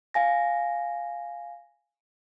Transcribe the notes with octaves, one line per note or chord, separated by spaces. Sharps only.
F5 G#5 A#6